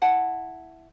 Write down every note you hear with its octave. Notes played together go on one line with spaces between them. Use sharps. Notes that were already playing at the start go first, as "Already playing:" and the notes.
E4 F#5 A5